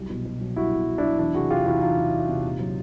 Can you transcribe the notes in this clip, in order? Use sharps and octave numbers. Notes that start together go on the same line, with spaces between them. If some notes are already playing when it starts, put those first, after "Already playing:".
Already playing: C2 F#3
B2
B2
F#3
C2 E4 F#4
B2
F#3
D4 E4
F#3
E2 D4 E4
C3 F#4 G#4
C3 F4 G4
E2 E4 F#4
E3 D#4 F4
C3
E2
C3
A#2
F#3